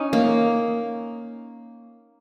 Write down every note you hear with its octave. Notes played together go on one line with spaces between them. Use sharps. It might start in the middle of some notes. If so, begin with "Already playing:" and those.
Already playing: C#4 D#4
A#3